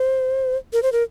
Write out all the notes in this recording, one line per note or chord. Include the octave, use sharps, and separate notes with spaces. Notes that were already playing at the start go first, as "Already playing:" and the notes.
Already playing: C5
A#4
C5
A#4